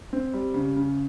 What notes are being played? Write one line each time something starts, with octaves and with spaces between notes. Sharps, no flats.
C4
G3
C#3
C#3